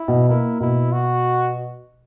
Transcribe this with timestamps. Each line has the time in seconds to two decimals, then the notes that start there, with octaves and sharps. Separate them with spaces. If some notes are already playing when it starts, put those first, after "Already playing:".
Already playing: E4
0.08 B2
0.29 A#3 E4
0.60 B2 E4
0.92 F#4